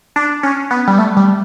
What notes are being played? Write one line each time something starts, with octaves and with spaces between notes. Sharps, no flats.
D4
C#4
B3
G3
A3
G3